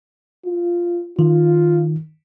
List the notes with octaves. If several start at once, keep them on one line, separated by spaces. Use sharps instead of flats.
F4
D#3 F4